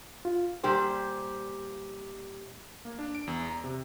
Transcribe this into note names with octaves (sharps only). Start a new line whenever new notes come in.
F4
A#2 G3 G4 C5
A#3
D4
D7
E2
A#5
C3